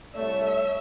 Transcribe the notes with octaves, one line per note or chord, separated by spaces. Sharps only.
C2 A3 C#5 E5